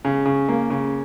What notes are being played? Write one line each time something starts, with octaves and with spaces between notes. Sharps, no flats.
C#3
C#3
A#3
C#3